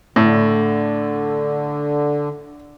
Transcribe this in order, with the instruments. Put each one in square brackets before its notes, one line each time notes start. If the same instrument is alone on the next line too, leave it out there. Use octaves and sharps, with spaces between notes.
[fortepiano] A2 [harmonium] D3